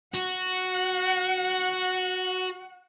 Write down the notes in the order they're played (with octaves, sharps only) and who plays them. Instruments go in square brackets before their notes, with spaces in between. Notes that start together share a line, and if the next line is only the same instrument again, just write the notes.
[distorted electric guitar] F#4 [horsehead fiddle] F#5